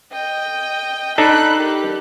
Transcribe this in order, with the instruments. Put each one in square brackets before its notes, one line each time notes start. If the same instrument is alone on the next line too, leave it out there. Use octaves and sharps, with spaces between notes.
[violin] D#5 G5
[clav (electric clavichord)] D4 D#4 A4 [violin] B5 F#6
[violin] G4 A#4